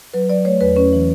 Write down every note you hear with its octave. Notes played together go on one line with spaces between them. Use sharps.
F#3 B4
F#3 D5
A3 C#5
E2 B4
C#4 B4
E3